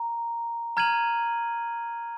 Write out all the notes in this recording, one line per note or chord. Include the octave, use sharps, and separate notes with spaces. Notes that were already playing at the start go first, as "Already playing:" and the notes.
Already playing: A#5
A#5 F6 G#6 D#7 F#7